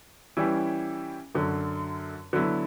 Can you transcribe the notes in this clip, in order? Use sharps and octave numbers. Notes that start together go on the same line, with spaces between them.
E3 G3 C#4 E4 G4
F#2 D3 F#3
D3 F#3 B3 E4